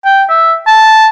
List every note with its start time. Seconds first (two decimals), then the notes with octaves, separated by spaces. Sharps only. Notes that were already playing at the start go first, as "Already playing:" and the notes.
0.05 G5
0.29 E5
0.67 A5